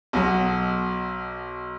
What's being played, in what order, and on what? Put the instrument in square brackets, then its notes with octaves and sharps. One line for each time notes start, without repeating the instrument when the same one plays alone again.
[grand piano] B1 B2 F#3